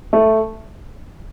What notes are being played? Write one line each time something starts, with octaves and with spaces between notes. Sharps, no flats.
A3